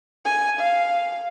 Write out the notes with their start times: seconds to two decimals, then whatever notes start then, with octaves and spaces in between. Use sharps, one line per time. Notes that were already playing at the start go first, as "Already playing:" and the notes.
0.25 G#5
0.60 F5